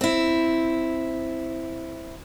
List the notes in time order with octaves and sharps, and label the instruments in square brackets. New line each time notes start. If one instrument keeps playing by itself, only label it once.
[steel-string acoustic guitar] C4 E4